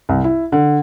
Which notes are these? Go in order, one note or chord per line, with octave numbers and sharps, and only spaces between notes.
C2
E4
D3